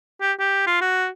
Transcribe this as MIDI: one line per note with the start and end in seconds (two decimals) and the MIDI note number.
0.21 0.33 67
0.39 0.65 67
0.67 0.80 65
0.81 1.07 66